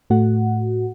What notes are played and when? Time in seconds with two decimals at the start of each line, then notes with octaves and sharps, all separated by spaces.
0.10 A2 A3 F#4 F#5